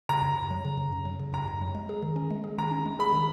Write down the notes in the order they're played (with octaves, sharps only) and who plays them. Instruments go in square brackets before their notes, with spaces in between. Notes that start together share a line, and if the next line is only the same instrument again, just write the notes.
[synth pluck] C#3 [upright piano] A#5
[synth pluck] F#2
F#2
F#3
C#3
F#2
F#2
F#3
C#3
[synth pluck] F#2 [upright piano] A#5
[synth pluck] F#2
F#3
G#3
G#4
D#3
C#4
G#3
G#4
[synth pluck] D#3 [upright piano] A#5
[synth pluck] C#4
G#3
[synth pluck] G#4 [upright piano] B5
[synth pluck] D#3